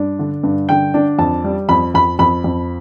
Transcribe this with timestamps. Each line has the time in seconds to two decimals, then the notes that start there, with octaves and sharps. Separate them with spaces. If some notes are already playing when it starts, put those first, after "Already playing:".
Already playing: G2 D4
0.19 D3
0.43 G2
0.69 D3 G5
0.94 D4
1.19 F2 A5
1.44 G3
1.69 F2 B5
1.94 F2 B5
2.19 F2 B5
2.44 F2